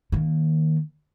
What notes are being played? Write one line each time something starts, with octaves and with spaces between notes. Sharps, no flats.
D#3 A#3